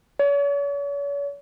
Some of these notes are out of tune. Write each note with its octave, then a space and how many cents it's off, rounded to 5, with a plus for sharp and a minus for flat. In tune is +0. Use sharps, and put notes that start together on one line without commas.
C#5 +40